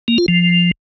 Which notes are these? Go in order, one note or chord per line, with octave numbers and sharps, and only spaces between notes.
A#3
F4
F3